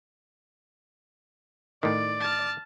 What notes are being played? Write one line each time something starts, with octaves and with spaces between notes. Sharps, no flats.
A2 D#3 D5
A5 F6